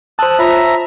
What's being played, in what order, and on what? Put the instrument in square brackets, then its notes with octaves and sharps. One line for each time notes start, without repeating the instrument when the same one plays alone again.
[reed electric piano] C5 A5 [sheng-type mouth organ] D#6 E6 F#6
[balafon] F4 C#5 B5 [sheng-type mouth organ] E5 A#5